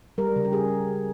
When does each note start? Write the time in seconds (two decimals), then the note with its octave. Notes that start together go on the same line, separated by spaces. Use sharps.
0.18 G3 A#4
0.36 C#3
0.45 G4
0.53 G#4